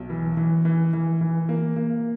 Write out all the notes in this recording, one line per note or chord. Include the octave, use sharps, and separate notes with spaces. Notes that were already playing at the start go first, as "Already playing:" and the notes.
Already playing: B1
E3
E3
E3
E3
E3
A#3
A#3